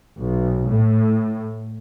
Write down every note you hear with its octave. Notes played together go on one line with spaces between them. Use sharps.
B1
A2